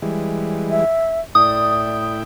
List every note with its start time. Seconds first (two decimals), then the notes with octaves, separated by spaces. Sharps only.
0.02 E3 G3 G#3
0.71 E5
1.35 A2 E4 D5 G5 D#6